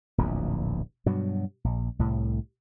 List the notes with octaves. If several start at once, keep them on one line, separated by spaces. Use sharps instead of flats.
D1 A#1 E2
G2 B2 F#3
A#1
C2 A2